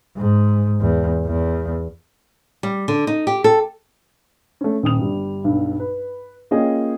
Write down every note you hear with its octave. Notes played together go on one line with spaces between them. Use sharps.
G#2
E2
E2
G3
D3
D#4
G4
A4
A3 C#4
D#1 G5 D#6 F7
G1 G3
B1 G2
B4
A#3 C#4 F4 G#4 D#5 G5